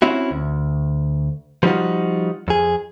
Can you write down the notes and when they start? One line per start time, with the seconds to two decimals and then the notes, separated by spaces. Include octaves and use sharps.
0.02 C4 C#4 E4 F#4
0.31 D2
1.63 F3 G3 B3 D#4 F4 F#4
2.48 F2 G#4